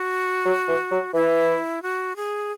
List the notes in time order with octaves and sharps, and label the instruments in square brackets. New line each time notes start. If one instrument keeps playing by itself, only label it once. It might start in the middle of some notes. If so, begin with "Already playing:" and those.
Already playing: [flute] F#4
[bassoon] F#3
E3
F#3
[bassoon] E3 [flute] E4
[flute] F#4
G#4